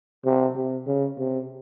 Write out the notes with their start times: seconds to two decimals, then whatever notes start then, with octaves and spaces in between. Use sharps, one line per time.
0.25 C3
0.56 C3
0.87 C#3
1.18 C3